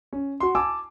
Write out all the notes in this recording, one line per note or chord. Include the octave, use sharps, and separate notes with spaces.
C#4
F#4 C6
G#5 A5 D6 E6